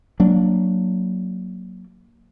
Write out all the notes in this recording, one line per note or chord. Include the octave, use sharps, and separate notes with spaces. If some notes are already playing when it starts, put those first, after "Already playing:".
F#3 A#3 D4